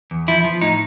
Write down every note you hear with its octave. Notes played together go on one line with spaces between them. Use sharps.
E2
F3 E4
F3
A2 D#4